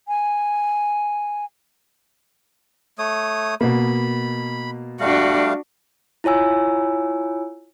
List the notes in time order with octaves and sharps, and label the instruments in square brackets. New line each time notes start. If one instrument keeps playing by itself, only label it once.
[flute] G#5
[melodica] A3 C#5 D#6
[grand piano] B2 A#3 [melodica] B5
[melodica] G3 A3 F5 [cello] D4 F#4
[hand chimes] E4 F4 C#5 G#5 E6